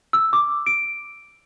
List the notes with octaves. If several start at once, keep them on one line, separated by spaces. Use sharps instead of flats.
E6
D6
D7